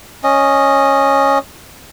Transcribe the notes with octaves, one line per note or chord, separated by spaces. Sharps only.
C#4 D#5